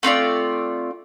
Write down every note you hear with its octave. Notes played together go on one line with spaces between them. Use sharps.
A3 C4 F4 D5